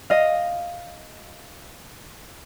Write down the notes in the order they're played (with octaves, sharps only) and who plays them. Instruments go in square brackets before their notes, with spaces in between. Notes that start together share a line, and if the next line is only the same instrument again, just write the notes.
[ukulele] D#5 F5